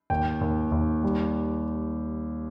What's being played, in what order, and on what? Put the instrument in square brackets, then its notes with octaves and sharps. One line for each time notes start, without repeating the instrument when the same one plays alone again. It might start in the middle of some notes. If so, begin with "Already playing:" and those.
[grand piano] D#2 G5
D#2
D#2
G3